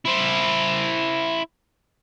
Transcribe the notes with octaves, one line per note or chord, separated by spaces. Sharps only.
E4 C5